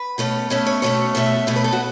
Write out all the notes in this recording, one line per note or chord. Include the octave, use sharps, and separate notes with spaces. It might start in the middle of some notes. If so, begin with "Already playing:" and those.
Already playing: B4
B2 A3 C#4
B2 A3 C#4 C#5
C#5
B2 A3 C#4 C#5
B2 A3 C#4 E5
B2 A3 C#4 C#5
B4
A4
F#4